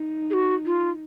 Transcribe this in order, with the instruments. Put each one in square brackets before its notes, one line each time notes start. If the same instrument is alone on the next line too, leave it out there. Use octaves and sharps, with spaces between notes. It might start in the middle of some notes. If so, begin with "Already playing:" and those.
Already playing: [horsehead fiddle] D#4
[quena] G#4
F#4
F4